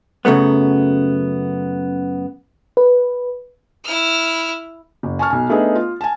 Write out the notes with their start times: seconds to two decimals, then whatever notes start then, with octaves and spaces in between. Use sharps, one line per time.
0.25 F#2 C#3 F#3 A3 B3
2.77 B4
3.84 E4 F6
5.03 F#1
5.19 G#5 A5 C#6 F6
5.30 B1 G#5
5.49 A3 B3 D4 D#4 G#4
5.75 F4
6.01 G#5 A5